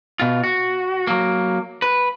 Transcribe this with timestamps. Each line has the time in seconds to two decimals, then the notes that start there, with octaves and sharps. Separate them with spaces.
0.20 B2 F4
0.44 F#4
1.07 F#3 A#3
1.82 B4